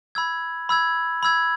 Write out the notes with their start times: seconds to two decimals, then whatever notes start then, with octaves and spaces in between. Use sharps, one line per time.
0.15 B5 E6 G#6
0.69 B5 E6 G#6
1.23 B5 E6 G#6